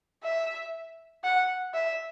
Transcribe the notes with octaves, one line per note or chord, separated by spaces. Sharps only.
E5
F#5
E5